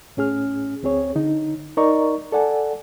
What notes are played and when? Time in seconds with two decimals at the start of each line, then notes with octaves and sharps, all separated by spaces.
0.17 A2 C#4 G#4 F6
0.83 D2 C4 G#4 C#5
1.15 D3 D#4
1.77 D#4 A#4 D5 D#5 A#5 C#6
2.32 A4 D5 F#5 G#5